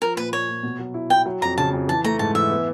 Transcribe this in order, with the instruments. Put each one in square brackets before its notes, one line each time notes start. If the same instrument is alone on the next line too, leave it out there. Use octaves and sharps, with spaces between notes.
[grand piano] F3 [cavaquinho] A#4
[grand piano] A#2 [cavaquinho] B4
[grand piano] A#3 [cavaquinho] C#5
[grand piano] A#2
B2
F#3
E4
[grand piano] E4 [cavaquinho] G5
[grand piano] F#3
[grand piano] F2 [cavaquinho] A#5
[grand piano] C#3 [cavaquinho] A5
[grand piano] F2
[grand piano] E3 [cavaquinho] A5
[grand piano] A3 [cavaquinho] A#5
[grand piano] G#2 [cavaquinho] A5
[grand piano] E3 [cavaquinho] E5
[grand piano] B3